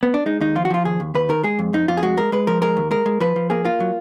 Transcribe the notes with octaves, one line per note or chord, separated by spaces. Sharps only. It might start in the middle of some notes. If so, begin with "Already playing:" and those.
B3
D4
G#3 D#4
D#2 D#4
F3 F4
F#4
F3 F4
D#2 G#4
D#2
D#2 B4
D#3 A#4
G#3 G#4
F2
F2 D#4
F2 F4
G#4
G#3 F#4
G#3 A#4
G#3 B4
F3 A#4
G#3 A#4
D#2
G#3 A#4
G#3
F3 B4
F3
A#3 G#4
A#3 F4
F#3